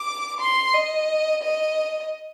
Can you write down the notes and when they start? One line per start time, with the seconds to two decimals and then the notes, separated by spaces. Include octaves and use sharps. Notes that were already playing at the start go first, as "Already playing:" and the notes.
Already playing: D6
0.41 C6
0.74 D#5
1.43 D#5